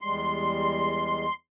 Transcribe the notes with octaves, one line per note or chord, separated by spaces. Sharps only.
E2 G3 G#3 C6